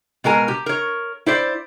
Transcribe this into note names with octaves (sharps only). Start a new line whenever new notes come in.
B2 G#3 A#4 G#5
G4
A#4 C#5
E4 C5 D5